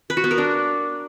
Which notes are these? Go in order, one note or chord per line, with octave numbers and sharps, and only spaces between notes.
B4
F#4
B3
A#4
D4